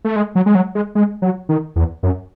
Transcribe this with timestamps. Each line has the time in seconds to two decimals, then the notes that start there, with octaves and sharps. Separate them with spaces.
0.05 A3
0.16 G#3
0.35 F#3
0.46 G#3
0.55 F#3
0.75 G#3
0.95 G#3
1.22 F#3
1.49 D#3
1.76 E2
2.03 F#2